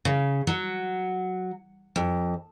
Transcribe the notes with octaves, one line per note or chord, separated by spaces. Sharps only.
C#3
F#3
F2